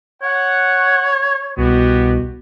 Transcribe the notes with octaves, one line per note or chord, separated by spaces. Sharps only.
C#5 F#5
C2 B2 B3 F#4 G4